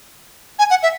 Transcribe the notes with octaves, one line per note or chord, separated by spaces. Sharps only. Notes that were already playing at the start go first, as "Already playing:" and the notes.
G#5
F#5
E5